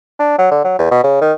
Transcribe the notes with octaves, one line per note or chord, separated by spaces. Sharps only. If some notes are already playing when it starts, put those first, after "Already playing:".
D4
F#3
D3
F#3
E2
B2
C#3
D#3